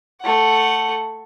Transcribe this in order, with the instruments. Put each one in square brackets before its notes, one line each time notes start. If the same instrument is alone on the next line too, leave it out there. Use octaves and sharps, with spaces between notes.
[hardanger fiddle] A3 F#5